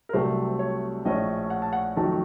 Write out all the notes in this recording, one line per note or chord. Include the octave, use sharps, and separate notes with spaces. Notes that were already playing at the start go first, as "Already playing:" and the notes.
A#4
C2 C3 F#3 A3 C4 C5
C#5
A#1 A2 A3 C#4 D#5
F#5
A5
F#5
F2 D#3 F#3 A3 A5